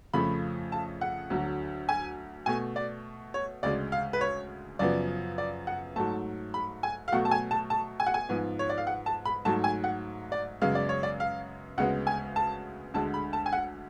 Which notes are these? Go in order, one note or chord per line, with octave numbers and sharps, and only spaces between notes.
F2 C#3 F3 A3 B5
A5
F#5
D2 D3 F#3
G#5
B2 A3 G#5
D5
C#5
D2 C#3 G#3 D5
F5
B4
C#5
F#2 C#3 F3 B3 D5
D5
F#5
G#2 F#3 A3 A5
B5
G#5
F5
B2 F#3 A3 F#5
A5
G#5
A5
A5
G#5
F#5
G#5
G#2 F3 B3
C#5
D5
F5
F#5
A5
B5
G#2 F#3 A3 A5
G#5
F#5
D5
F#2 C#3 G#3 B3 F5
D5
C#5
D5
F5
D2 C#3 G#3 B3 F#5
G#5
A5
D2 D3 G#3 A5
B5
A5
G#5
F#5